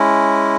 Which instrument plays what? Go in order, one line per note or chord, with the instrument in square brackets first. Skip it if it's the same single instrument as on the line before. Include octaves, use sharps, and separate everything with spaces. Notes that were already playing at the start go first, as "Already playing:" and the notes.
Already playing: [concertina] G#3 C#4 E4